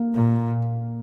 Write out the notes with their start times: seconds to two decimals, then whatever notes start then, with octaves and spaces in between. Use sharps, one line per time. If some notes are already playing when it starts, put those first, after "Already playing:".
Already playing: A#3
0.14 A#2